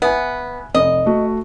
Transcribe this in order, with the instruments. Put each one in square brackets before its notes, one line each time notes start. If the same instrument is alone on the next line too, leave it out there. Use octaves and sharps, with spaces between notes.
[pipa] B3 [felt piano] E5 G#5
[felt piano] F1 [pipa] D#5
[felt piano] A3 F#4